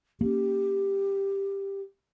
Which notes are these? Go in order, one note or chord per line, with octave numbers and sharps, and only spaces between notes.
A#3 C#4 G4